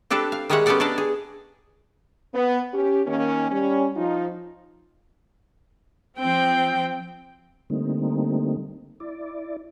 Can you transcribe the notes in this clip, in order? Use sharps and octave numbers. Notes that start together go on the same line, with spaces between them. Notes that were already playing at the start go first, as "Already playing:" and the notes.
C4 D4 G4 A4 B4
F5
D#3 G3 G#3 C#5 E5 F#5
B3 C#4 G4 A4 D5 F#5
D4 D#4 G4 A4 D5
G#4
B3
C#4 G4
D#3 A#3 C#4
G3 C#4
F3 D#4 F4
F3 C4 G5
D3 G3 A3 A#3 C4 D#4
E4 D5